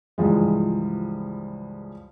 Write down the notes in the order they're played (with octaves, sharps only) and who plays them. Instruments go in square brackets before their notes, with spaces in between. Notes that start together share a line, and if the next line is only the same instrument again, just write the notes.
[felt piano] C#2 G2 E3 F3 G#3